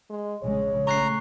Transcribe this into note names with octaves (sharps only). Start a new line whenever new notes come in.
G#3
A#1 C#3 G#3 C#5
A3 C#4 A#5 C#6 F#6 C7